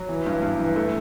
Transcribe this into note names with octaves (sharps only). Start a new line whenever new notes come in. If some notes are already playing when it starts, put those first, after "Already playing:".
Already playing: F#3
E3
G2
G2
E3
A3